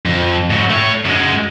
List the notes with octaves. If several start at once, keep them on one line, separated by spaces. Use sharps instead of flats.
F2
G#2 F#3
A3 C#5
F#2 G#3